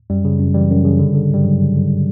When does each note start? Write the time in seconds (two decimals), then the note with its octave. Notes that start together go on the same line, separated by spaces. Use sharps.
0.10 F#2 G3
0.25 C#3
0.40 F#2
0.54 E3 G3
0.70 F#2
0.84 C#3
0.99 D3
1.14 D3
1.30 G2 G3
1.45 G2 F#3
1.60 D3
1.75 D3